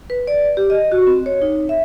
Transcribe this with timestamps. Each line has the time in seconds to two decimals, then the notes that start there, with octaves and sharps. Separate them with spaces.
0.10 B4
0.27 D5
0.57 G4
0.70 D#5
0.92 F#4
1.07 C4
1.26 C#5
1.42 D#4
1.69 E5